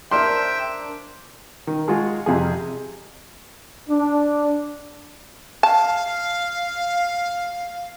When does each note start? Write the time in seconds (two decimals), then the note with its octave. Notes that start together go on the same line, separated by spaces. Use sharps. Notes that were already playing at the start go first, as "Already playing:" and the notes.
0.11 D4 A#4 C5 E5 G5 C6
1.67 D#3
1.88 G#3 F4 F#4 G#4
2.26 F2 C3 F3 G#4
3.89 D4
5.63 F5 A5